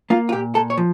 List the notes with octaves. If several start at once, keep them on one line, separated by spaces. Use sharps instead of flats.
A#3 F4
F4
A#2 G4
A#2 A4
C#5
F3